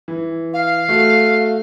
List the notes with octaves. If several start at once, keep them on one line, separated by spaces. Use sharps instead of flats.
E3
F5
A3 F#4